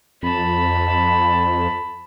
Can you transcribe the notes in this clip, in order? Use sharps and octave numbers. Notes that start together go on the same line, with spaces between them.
F2 A5 B5